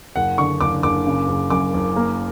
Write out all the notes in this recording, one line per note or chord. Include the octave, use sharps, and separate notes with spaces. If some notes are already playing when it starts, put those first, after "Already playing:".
F#1 F#5
D3 C#6
F#1 D6
F#1 D6
C#3
F#1
F#2 D6
F#1
A#3